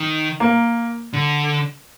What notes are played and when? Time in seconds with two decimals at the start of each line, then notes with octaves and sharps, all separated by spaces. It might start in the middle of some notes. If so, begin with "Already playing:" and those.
Already playing: D#3
0.40 A#3
1.13 D3